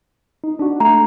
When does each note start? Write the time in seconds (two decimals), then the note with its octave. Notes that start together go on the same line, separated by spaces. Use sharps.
0.44 D#4
0.59 D4 F#4
0.80 A3 A#5